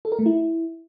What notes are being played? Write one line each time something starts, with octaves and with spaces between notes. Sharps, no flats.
A4
A#4
A3
E4